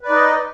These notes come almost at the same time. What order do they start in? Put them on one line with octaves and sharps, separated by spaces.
B4 D5 D#4 D#5